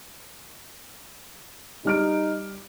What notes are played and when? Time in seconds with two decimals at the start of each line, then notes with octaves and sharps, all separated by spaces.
1.85 G3 D#4 F6 D7